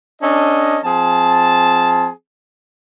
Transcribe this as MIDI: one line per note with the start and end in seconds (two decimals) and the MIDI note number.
0.21 0.78 61
0.21 0.78 62
0.21 0.78 69
0.21 0.78 75
0.84 2.08 53
0.84 2.08 60
0.84 2.08 68
0.84 2.08 81